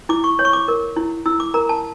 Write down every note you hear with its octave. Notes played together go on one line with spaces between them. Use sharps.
E4 D6
C#6
C#5
C#6
D6
A#4
E4
E4 E6
D6
A#4 A#5
A5